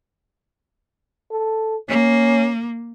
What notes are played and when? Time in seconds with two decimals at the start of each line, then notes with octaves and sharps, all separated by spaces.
1.31 A4
1.89 A#3 C#4